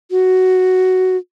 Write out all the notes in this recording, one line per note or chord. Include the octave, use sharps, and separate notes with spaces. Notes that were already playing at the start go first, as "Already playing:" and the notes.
F#4